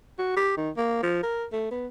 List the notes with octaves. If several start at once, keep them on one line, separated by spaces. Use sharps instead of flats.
F#4
G4
D#3
A#3
F3
A#4
A3
B3